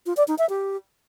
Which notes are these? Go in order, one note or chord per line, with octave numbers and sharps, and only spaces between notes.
F4
D5
D#4
E5
G4